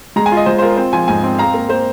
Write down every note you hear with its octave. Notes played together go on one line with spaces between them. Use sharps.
G#3 A#5
G#5
F4
D#5
G#3 C5
C5
F4 A#4
C4 C5
F3 G#5
G#2 G#5
C4
F5 A#5
A#3
A#3 C5